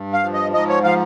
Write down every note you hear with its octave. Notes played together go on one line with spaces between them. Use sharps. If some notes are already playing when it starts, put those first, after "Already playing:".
Already playing: G2
F5
F3
D#5
G#2 D#5
C#5
F3 F5